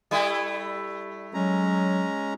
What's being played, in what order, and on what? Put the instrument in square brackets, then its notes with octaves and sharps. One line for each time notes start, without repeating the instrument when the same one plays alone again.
[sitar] G3 A3 E4
[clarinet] F#3 [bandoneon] G#3 C#4 A#5